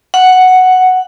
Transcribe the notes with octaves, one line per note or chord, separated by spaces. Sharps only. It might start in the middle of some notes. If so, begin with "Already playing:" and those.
F#5